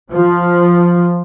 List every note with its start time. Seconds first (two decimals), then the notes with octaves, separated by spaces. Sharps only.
0.11 F3